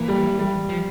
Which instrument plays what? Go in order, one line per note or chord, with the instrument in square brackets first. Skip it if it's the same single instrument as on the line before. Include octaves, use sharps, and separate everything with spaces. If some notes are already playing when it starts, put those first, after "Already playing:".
Already playing: [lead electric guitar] E3 [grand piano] A#3
[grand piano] G3
G3
[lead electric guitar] F3